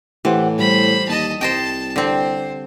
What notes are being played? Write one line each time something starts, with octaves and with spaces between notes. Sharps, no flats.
A2 E3 G4 C5 F#5
G3 C5 B5
D#2 D#5 A5
C2 C5 D#5 G5 A5
D3 C4 C5